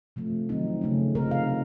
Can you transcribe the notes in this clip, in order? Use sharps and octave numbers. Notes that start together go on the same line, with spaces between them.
C3 F3 A3
D#3 F#3 C4 D#4
C#3 A3 C#4
C3 F3 C4 D#4 A#4
F5
D#4